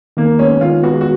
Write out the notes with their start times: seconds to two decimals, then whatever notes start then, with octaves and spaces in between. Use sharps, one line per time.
0.17 D#3 A#3
0.39 G#3 B3 C#4
0.61 D#3 F4
0.83 G#3 B3 F#4
1.01 F#4